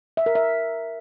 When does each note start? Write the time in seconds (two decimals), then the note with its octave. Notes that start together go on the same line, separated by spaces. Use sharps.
0.17 E5
0.26 A#4
0.35 E5